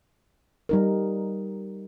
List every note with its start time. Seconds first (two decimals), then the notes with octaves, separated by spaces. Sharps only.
0.69 G3 D#4 A#4